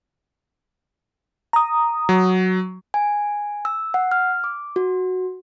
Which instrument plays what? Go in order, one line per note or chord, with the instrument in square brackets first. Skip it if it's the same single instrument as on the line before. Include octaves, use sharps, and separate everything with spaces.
[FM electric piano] A#5 D#6
[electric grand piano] F#3
[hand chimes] G#5
E6
F#5
F6
D6
F#4